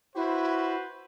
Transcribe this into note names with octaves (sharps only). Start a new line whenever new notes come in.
E4 F#4 B4 C5